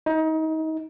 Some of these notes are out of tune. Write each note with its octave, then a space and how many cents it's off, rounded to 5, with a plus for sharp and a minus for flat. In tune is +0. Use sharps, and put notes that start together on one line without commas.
D#4 +30